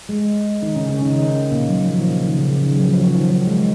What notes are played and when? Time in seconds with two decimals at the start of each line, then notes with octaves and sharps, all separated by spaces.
0.09 G#3
0.62 D#3 D#4
0.75 C#3 C#4
0.89 C#3 C#4
1.02 D#3 D#4
1.16 D#3 D#4
1.51 A#2 A#3
1.69 F#3
1.83 F3
1.95 D#3
2.09 C#3
2.23 D#3
2.36 C#3
2.48 C#3
2.62 D#3
2.75 F#3
2.82 F3
2.89 F#3
3.02 F3
3.15 D#3
3.29 F#3
3.47 G#3